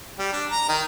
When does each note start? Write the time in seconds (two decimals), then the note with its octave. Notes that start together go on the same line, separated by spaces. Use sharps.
0.18 G3
0.33 D4
0.51 A#5
0.69 D#3